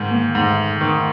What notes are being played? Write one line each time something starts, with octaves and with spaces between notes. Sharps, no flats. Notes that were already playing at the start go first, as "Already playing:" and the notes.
Already playing: G#2 D#3
A#3
G#2 A3
D#3